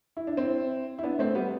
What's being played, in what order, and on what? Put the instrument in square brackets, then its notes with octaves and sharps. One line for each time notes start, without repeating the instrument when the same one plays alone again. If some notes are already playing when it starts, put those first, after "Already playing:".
[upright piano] E4
D4
C4 E4
E4
B3 D4
A3 C4
G3 B3